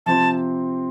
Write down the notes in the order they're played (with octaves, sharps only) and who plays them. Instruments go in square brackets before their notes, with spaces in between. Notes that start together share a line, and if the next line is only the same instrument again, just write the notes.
[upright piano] C3 F3 C4 [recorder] A5